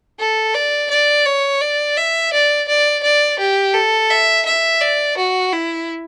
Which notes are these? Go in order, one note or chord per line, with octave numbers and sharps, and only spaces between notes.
A4
D5
D5
C#5
D5
E5
D5
D5
D5
G4
A4
E5
E5
D5
F#4
E4